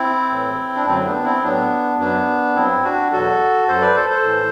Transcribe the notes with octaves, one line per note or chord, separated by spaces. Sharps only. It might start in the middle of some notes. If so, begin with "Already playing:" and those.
Already playing: C4 E4
A2 E3
D4
F#2 D3 F#3 A3 C4
B3 D4
C4 E4
A2 F#3 B3 D4
F#2 F#3 B3 D4
G2 F#3 C4 E4
D4 F#4
E2 B2 F#3 F#4 A4
F#2 F#3 A4 C5
B4 D5
A4 C5
A4 C5
A2 E3